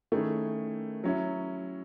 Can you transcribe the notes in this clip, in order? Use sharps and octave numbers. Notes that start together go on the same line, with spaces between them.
D#3 A3 C#4 E4 G#4
F#3 C#4 E4